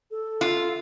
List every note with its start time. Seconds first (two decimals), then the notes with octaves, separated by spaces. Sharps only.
0.11 A4
0.41 F4